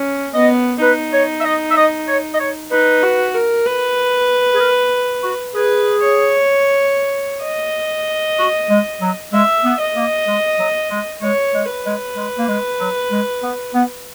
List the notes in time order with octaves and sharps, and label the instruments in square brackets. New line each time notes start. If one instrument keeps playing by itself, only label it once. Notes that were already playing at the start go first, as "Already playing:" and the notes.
Already playing: [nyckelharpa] C#4
[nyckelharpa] B3 [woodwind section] D#5
[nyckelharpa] D#4 [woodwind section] B4
[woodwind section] C#5
E5
D#5
E5
D#5
C#5
D#5
C#5
[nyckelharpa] D#4 [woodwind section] B4
[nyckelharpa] F#4
A#4
B4
[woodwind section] G#4
A#4
F#4
[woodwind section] G#4 [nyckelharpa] B4
[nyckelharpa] C#5
D#5
[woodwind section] F#4
G#3
F#3
[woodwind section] G#3 [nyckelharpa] E5
[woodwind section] B3
[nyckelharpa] D#5
[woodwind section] A#3
G#3
F#3
G#3
[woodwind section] G#3 [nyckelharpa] C#5
[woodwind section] G#3
[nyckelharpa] B4
[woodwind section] G#3
G#3
A#3
G#3
F#3
G#3
B3
B3